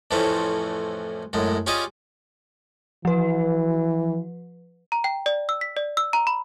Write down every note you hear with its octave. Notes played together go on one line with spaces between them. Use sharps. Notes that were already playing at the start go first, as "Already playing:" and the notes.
F2 A2 E3 A3 C4 C#4
F#2 A2 G#3
C#4 F4 G4 G#4 D5 D#5
E3 F3 B4
A#5
G5
D5
E6
B6
D5
E6
A#5
B5